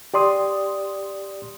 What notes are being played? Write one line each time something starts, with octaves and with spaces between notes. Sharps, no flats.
G4 D5 C6 D#6